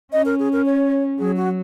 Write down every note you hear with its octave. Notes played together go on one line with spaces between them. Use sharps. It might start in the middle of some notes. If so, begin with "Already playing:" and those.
C#4 D#5
A#4
G#4
A#4
C#5
F#3 G#4
F#4